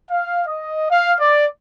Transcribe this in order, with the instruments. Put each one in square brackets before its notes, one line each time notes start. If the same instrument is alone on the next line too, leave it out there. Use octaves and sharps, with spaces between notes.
[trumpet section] F5
D#5
F5
D5